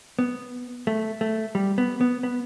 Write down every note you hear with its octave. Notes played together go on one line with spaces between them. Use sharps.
B3
A3
A3
G3
B3
B3
B3